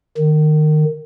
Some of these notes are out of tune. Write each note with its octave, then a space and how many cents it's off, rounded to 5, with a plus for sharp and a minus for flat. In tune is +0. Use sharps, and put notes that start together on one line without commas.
D#3 -25